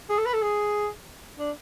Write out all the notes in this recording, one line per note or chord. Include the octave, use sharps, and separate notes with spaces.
G#4
A4
B4
A4
G#4
D4